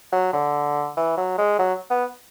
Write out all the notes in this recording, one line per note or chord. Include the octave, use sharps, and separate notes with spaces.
F#3
D3
E3
F#3
G#3
F#3
B3